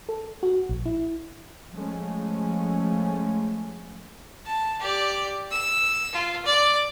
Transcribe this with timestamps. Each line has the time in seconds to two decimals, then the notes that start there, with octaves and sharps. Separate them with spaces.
0.09 A4
0.43 F#4
0.69 A#1
0.86 E4
1.72 F3 G#3 A3 C#4
4.46 A5
4.80 G4 D5
5.51 E6
6.13 F4
6.46 D5